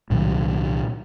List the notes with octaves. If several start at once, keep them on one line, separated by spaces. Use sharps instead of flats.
C2 A#2 D#3 F#3